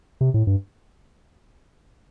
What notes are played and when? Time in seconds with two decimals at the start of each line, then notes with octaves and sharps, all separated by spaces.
0.21 C3
0.34 A2
0.47 G2